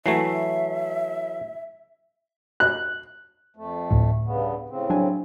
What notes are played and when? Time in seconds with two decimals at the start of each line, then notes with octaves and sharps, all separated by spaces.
0.06 E3 F#3 A3 C#5 E5 C7
2.60 F#6
3.56 F2 A3
3.91 D2 A2
4.25 G2 C#3 B3
4.70 A2 C#3 C4
4.90 F#3 D4 G#5